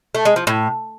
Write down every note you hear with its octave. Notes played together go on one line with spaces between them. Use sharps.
A3
G#3
F3
A2